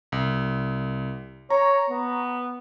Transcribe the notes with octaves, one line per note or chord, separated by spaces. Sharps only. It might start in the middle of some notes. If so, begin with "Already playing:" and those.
C2
C#5 A#5 C#6
B3